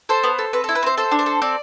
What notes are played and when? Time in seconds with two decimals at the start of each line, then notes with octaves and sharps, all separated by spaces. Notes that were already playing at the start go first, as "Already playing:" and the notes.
0.09 A4 C5
0.23 B3
0.39 A4
0.53 C4 B4
0.64 E4 A4
0.75 B4
0.83 C4 C5
0.97 A4 C5
1.11 D4
1.19 C5
1.26 A4
1.42 C4 D5